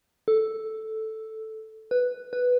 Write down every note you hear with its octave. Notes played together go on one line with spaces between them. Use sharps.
A4
B4
B4